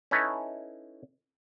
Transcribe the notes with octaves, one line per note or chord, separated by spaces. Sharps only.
C#4 D#4 E4 A4 B4 C#5